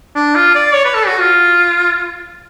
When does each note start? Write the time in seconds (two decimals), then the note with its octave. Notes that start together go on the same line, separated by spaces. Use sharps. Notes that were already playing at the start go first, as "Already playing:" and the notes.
0.16 D4
0.36 F4
0.55 D5
0.74 C#5
0.85 B4
0.94 A4
1.07 F#4
1.20 F4